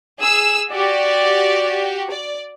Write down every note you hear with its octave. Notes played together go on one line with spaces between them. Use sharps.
G#4 E6
F#4 G4 D5
D5